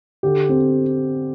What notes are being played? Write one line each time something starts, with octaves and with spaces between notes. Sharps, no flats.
D3 G4
C4